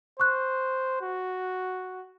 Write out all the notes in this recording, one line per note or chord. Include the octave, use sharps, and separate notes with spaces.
C5 C#6 F#6
F#4